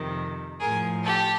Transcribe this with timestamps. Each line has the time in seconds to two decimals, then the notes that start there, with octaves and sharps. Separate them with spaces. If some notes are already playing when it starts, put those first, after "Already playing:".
Already playing: F2 C3 D#3
0.60 A2 F3 G#4 A#4
1.04 G4 A4